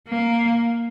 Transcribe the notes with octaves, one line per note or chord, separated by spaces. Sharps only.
A#3